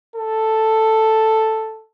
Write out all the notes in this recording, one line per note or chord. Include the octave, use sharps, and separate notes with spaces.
A4